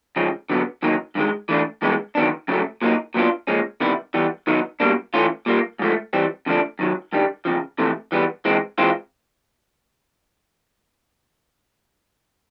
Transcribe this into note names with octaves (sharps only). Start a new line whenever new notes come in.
F2 C#3 F3 G#3 C#4
D3 F#3 B3
F#2 D#3 F#3 A#3 D#4
G2 D#3 G#3
E3 A3 D4
G2 E3 G#3 B3
D#3 F#3 B3 D4
F#2 C#3 F#3 A3
A#2 F#3 A#3 D#4
A#2 F#3 B3 D4 F4
A#2 F3 G#3 C#4
C3 D#3 G3 B3 E4
E3 G3 B3
D#3 F#3 B3 D#4
B2 G3 A#3 D4
E3 A3 C#4 F4
A#2 G3 A#3
G#2 F3 A3
E3 G3 C4
F2 D3 F3 A3 D4
F#2 D#3 F#3
G2 D#3 G3
F2 C#3 F3
F2 C3 E3 A3
E3 G3 B3
E3 G#3 C4
E3 G#3 C4 F4